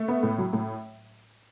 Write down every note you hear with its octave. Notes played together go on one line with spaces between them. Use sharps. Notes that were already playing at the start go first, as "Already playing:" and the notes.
Already playing: A3
B3
A2
F#3
A2